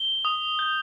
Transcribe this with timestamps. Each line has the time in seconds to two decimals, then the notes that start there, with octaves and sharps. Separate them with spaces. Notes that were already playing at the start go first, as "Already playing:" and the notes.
Already playing: G7
0.25 D#6
0.59 G6